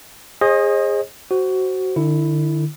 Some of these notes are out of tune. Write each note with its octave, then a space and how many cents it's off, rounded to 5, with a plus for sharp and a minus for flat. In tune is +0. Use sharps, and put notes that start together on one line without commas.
G#4 -15 C5 +40 D#5 +0
F#4 +20 C5 +0
D3 +40 E4 +0